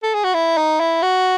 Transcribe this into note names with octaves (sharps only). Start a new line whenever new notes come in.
A4
G#4
F#4
E4
D#4
E4
F#4